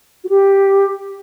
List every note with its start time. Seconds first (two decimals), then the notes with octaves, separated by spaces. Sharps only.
0.24 F#4
0.29 G4